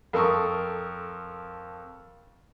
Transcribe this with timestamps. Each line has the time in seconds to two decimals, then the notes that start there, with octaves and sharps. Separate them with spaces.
0.13 F2 A4 A#4 C#6 D#6